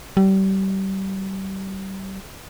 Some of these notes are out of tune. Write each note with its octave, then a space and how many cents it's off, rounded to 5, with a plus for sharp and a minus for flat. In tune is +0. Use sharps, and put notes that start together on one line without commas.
G3 -30